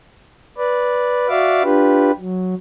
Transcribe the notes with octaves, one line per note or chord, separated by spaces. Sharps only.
B4 D5
F#4 D5 E5 F5 D6
D4 F4 G4 B4
F#3